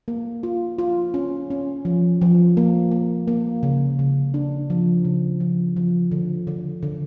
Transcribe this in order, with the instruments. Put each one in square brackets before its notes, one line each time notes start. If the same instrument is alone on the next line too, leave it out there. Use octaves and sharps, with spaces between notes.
[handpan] A#3
F4
F4
C#4
C#4
F3
F3
A#3
A#3
A#3
C#3
C#3
D4
F3
C#3
F3
F3
D3
D3
D3